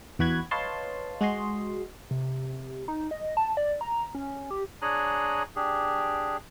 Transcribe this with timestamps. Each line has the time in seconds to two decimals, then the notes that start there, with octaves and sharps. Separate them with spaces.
0.19 E2 E3 F#4 B5 F#6 G#6
0.51 B4 C#5 D#5 F5 A5 C6
1.21 G#3 F#4 G#4 D#5 C6
2.11 C3
2.88 D#4
3.11 D#5
3.37 A5
3.57 D5
3.81 A#5
4.15 C#4
4.51 G4
4.82 D4 G#4 C#5 G#5 A#5 F#6
5.56 D4 G4 G#4